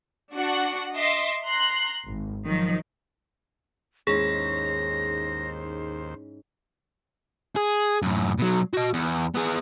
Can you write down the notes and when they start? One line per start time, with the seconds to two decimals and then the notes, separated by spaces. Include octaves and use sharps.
0.35 D4 F#4 F#5
0.95 D#5 E5 C6 D6
1.46 A#5 C6 F#6
2.07 G#1
2.46 D#3 F3 F#3
4.07 D#2 G#2 C#4 E4 G#4 C5 A#6
7.56 G#4
8.02 F#2 A2
8.38 B2 F#3
8.74 F#4 D#5
8.93 E2
9.35 B3 G#4